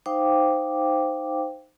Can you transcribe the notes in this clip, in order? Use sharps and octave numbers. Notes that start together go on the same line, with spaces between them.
D#4 C5 F5 G5 D6